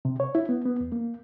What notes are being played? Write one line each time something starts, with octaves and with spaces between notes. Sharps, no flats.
C3
C#5
E4
B3
B3
E2
A#3